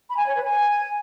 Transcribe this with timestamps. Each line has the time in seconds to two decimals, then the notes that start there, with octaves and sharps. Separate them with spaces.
0.09 B5
0.18 G#5
0.27 C#5
0.36 B4
0.45 G#5